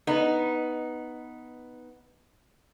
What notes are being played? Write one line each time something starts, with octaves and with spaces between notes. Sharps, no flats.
B3 D#4